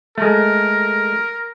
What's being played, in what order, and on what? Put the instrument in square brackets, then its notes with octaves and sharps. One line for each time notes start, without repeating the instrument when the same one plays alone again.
[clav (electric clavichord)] G#3 A3 [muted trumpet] A#4